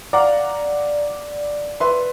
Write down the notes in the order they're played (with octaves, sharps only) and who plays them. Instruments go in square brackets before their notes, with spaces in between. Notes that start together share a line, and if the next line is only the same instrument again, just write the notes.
[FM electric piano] D5 [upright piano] F5 F#5 A#5
[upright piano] B4 E5 C6